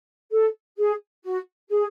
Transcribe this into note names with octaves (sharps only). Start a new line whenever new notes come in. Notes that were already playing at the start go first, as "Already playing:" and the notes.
A4
G#4
F#4
G#4